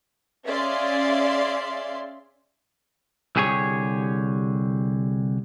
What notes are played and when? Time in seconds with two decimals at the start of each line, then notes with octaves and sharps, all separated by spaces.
0.45 C#4 G#4 D5 E5 F5 C6
3.36 C2 D3 G4 G#4 B4 C#5